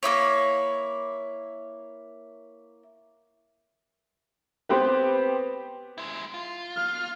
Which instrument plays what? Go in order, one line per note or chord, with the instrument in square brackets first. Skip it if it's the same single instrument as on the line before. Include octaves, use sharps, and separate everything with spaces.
[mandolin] A#3 D#4 E4 C#5
[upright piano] B3 C4 G4 B4
[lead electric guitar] G#3 E4
F4
[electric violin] F6